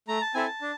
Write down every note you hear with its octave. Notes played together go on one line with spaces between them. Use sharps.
A3 A#5
A5
C4 E4 A4 G#5
A5
D4